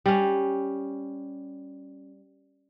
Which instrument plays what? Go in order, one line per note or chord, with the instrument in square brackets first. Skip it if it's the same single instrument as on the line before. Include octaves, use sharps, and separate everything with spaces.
[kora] G3 C#4